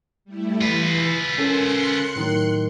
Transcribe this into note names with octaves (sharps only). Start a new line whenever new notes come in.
G3 A3 E4
E3 F4 B4
C#4 A4 A#4 C6 F#6 C#7
A2 D#3 F#3